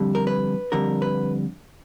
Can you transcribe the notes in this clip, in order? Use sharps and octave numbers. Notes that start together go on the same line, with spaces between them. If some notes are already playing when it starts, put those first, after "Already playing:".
Already playing: F2 D3 G3
A#4
B4
F2 D3 G3 A#4
B4